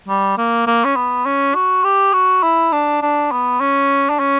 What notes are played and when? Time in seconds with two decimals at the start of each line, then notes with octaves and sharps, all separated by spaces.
0.08 G3
0.38 A#3
0.67 A#3
0.84 C#4
0.96 B3
1.25 C#4
1.55 F#4
1.84 G4
2.13 F#4
2.43 E4
2.72 D4
3.02 D4
3.32 B3
3.60 C#4
4.09 D4
4.19 C#4